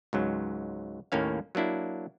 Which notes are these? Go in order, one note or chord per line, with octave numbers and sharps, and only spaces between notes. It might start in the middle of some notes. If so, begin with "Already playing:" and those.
C#2 G#2 F#3
D#2 A2 A#3 C#4 F5
F#3 A#3 D4 E4